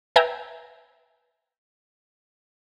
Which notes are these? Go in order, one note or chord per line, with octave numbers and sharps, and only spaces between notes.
B4 E5 G5 G#5 A#5